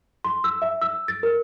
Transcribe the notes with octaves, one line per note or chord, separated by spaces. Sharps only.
C6
E6
E5
E6
A6
A#4